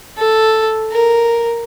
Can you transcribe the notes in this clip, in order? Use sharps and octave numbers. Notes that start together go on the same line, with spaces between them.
A4
A#4